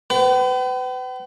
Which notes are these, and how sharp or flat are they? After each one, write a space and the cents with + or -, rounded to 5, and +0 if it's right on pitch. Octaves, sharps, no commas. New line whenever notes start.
B4 +35 G5 -45